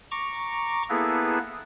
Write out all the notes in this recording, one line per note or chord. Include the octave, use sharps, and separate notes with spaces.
A#5 C#6 D6
A#3 B3 E4 G#4 A4 B4